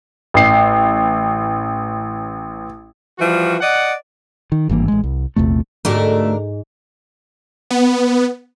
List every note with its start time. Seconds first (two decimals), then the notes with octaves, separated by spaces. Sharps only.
0.34 A1 C7
3.19 E3 F3 G3 F#4
3.61 D5 D#5 F#5
4.52 D#3
4.69 G#1 G2 E3 A#3
4.88 A1 G#3
5.04 C2
5.36 A#1 E2 C3 A3
5.85 D2 G#2 A3 D4 F#4 G4 A#4
7.70 B3